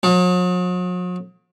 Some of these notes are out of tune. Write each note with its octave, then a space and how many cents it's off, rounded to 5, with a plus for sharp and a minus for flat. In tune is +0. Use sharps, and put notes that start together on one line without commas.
F#3 -45